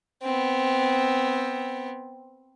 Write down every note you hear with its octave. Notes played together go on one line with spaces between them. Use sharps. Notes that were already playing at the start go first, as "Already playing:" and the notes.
B3 C4